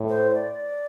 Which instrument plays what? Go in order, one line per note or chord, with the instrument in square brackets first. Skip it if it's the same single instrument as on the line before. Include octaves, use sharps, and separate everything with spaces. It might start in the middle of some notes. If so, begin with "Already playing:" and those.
Already playing: [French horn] A2
[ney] C5
C#5
D5